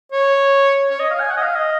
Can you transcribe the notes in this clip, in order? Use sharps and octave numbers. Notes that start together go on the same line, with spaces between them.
C#5
C#5
D#5
F5
G#5
F#5
D#5
F5
D#5